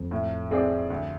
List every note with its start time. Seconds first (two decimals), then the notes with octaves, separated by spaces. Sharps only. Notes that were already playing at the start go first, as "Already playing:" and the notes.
Already playing: F2
0.11 A2
0.51 G#3 C4 G#4 D5
0.90 D2